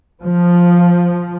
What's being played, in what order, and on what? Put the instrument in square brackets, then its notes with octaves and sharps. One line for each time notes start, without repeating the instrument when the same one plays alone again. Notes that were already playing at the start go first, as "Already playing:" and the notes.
[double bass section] F3